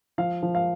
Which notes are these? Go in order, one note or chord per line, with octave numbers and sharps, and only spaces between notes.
F3 F5
F3
F5